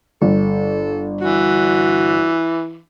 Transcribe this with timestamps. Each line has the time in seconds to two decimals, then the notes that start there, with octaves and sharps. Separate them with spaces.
0.22 G1 A4
1.21 E3 F#4